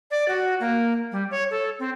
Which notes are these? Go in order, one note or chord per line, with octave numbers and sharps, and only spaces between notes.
D5
F#4
A#3
G3
C#5
A4
C4